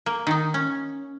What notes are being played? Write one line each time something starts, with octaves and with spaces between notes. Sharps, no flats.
A#3
D#3 D#4
C#4